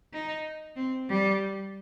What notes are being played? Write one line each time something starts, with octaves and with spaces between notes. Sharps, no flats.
D#4
C4
G3